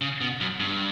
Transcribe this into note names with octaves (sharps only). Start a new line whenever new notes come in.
C#3
B2
F#2
G2